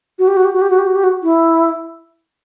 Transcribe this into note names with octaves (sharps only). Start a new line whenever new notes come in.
F#4
G4
F#4
G4
F#4
G4
F#4
G4
F#4
G4
F#4
E4